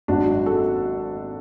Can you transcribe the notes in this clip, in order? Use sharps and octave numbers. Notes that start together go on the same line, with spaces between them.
G#1 G#2 F#3 D4 F#4
F#4 A4